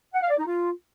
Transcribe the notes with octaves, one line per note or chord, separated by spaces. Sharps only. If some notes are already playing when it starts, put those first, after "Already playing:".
F#5
F5
D5
D#4
F4